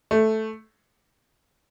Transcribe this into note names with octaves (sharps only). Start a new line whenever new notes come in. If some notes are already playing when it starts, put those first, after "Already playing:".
A3